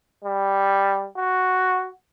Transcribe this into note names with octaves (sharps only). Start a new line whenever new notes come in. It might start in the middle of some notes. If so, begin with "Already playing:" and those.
G3
F#4